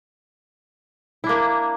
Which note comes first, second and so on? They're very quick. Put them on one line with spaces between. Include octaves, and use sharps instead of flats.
E4 D4 A#3